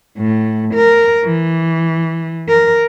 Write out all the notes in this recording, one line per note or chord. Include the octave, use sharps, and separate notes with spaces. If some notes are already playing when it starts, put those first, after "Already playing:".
A2
A#4
E3
A#4